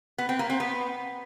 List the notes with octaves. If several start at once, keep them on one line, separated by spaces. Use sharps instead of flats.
B3
C4
A#3
C4
B3